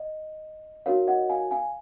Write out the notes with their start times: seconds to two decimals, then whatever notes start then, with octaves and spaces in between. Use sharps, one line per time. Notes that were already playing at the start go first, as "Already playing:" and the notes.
Already playing: D#5
0.86 D#4 F#4 A#4 C#5 F5
1.08 D#5 F#5
1.30 F5 G#5
1.51 F5 G#5